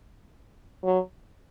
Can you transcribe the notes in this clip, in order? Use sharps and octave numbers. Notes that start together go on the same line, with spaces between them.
F#3